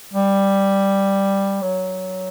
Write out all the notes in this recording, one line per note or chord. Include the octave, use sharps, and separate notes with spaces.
G3
F#3